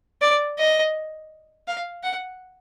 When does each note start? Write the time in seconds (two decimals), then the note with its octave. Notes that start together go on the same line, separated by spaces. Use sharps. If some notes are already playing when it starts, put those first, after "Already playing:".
0.22 D5
0.59 D#5
1.67 F5
2.03 F#5